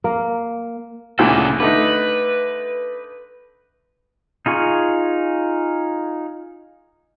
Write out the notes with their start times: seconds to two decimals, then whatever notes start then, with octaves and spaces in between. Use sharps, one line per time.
0.04 A#3
1.19 D2 A#2 C#3 E3 A4
1.60 D3 A3 D#4 B4
4.46 D#4 F4 G#4 C#6